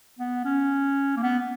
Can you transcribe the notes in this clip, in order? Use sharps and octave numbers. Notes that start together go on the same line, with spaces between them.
B3
C#4
A#3
B3